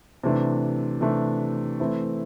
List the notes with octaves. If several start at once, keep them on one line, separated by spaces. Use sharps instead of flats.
C3 E3 A3 D4
C3 E3 A3 D4
E3 A3 C4 E4